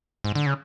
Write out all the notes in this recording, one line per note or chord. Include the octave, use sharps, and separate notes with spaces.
G#2
D3
C#3